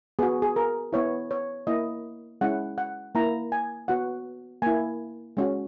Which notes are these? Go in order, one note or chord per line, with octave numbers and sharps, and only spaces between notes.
B3 F#4 G#4
G#4
A#4
B3 E4 C#5
C#5
A#3 E4 D#5
G#3 C#4 E4 F#5
F#5
A#3 E4 A#5
G#5
B3 F#4 F#5
A#3 E4 G#5
G#3 C#4 F#4